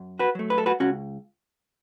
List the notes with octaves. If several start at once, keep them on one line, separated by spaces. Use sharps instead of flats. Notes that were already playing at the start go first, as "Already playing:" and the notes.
Already playing: F#2
F#4 B4
F#3 A3
B4
A4
F#4 B4
C#2 C#4 F#4